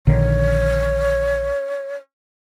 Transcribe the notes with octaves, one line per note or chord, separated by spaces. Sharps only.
A#1 D3 D#3 C#5